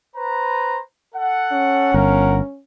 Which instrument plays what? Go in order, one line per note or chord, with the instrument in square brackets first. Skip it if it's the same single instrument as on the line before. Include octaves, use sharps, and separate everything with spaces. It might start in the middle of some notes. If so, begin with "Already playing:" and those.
[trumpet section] B4 C5 A#5
A4 F#5
[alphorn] C#4
[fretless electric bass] G1 [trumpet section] A#4 F5 F#5